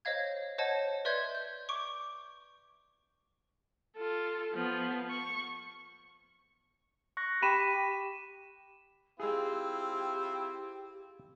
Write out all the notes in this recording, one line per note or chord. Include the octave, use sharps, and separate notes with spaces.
C5 C#5 D#5 F5 G#6
C5 C#5 D#5 F#5 A5
B4 D5 E5 C6 G6 G#6
G6
C#6 D6 D7
F4 A4
F3 B3
C#6
C#6 F#6 A#6
G4 B5 B6 D#7 E7
G#3 C4 E4 F4 G4 G#4